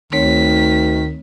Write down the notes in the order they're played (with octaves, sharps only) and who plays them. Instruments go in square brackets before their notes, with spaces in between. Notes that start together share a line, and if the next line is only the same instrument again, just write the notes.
[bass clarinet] D2 [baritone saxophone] D#3 [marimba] A3 C4 C#5 [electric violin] B6